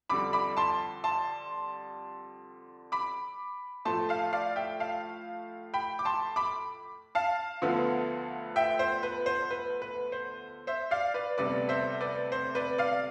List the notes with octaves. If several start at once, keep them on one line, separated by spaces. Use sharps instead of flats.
F2 D3 G3 B5 D6
B5 D6
A5 C6
A5 C6
B5 D6
A2 F3 A3 A5 C6
F5 A5
D5 F5
E5 G5
F5 A5
G5 B5
D6
A5 C6
B5 D6
F5 A5
D2 D3 F3 B3
E5 G5
C5
B4
C5
B4
B4
C5
C5 E5
D5 F5
B4 D5
D2 C3 G3 B3 B4 D5
C5 E5
B4 D5
C5
B4 D5
D5 F5